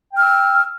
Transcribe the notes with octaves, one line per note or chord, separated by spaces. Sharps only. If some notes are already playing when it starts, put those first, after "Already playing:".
G5 E6 F6